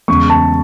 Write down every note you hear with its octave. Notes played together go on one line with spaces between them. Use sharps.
E2 C#3 G#3 C#6
A5